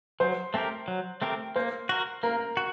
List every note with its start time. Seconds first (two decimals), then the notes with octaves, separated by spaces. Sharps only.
0.20 F#3 C5
0.54 A3 C4 G4 A#4
0.88 F#3
1.22 A3 C4 G4 A#4
1.56 A#3 C5
1.89 F#4 A#4
2.23 A#3 A#4
2.57 F#4